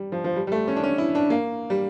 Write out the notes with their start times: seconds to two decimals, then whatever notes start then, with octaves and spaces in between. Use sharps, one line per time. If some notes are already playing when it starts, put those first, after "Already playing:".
Already playing: G3
0.12 F3
0.24 F3
0.36 G3
0.47 G3
0.52 A3
0.68 C#4
0.76 D4
0.83 C#4
0.98 E4
1.15 D4
1.30 A#3
1.70 G3